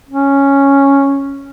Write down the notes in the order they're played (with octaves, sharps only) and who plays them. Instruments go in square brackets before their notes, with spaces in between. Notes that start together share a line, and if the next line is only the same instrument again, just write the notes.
[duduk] C#4